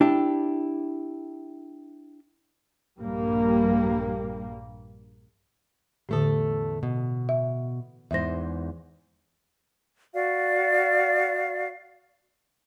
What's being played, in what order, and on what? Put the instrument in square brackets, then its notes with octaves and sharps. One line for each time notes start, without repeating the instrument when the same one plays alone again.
[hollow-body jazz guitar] D4 E4 G4
[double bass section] A#1 G2 G3 A#3
[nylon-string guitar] E2 A3 A4 [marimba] A2 D3
[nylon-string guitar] B2
[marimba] E5
[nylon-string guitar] E2 G#2 C5 [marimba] E5 A#6
[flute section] F#4 D5 F5